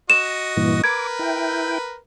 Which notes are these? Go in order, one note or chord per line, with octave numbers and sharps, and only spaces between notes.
F#4 D#5 E7
G2 A#2 E3
A#4 B4 D6 G#6
E4 G5